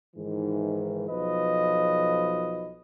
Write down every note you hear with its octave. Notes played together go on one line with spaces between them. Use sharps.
G#2 D#3 E3
B1 F3 B4 D#5